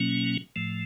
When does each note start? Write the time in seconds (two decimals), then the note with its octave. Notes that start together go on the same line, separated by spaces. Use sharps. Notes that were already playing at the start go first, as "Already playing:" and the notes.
Already playing: B2 F#3 A#3 C#4
0.56 A2 F3 A3